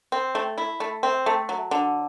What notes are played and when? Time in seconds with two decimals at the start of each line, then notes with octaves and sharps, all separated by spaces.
0.12 C4
0.35 A3
0.58 E4
0.80 A3
1.03 C4
1.26 A3
1.49 F#3
1.71 D3